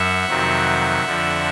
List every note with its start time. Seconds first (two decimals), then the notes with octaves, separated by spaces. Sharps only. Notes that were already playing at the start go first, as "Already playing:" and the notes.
Already playing: F#2 E5 F#5
0.25 F2 C3 D#3 F#3
1.03 F2 D3 F3